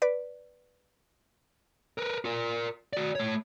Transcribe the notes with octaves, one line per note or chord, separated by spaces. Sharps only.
B4 D5
A#4 B4
F4 A#4
F#4 D5
A3 C#5